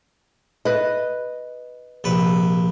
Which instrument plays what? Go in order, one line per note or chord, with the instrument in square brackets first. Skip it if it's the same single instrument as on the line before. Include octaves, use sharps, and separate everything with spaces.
[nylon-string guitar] B4 D#5
[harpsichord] A#1 C3 B4